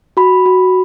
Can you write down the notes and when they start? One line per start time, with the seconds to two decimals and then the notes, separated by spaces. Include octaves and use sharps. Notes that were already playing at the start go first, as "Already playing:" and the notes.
0.17 F#4 B5
0.46 F#4